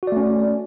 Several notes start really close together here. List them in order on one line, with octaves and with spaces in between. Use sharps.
F#4 D5 A3 C#4